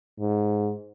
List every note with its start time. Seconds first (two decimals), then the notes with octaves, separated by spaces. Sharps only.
0.19 G#2